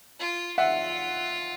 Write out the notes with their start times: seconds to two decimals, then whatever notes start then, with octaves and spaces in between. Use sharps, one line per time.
0.19 F4
0.57 F4 E5 F#5